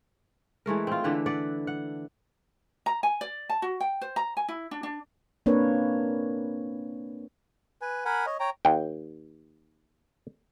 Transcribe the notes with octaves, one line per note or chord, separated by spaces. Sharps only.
E3 G#3 A3 A#4
C4 F4
D3 E3 D4 B4
B4 D5 F#5
F#5
A#5
G#5
D5
A5
F#4
G5
C5
A#5
G#5
E4
D4
D4
A#3 C4 D4 A#4 B4 C#5
B4 G#5
A#4 F#5 G#5 B5
C#5 D#5
C#5 G5 A#5
D#2 G5